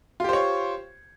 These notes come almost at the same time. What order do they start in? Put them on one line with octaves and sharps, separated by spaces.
F4 G4 C5 C#5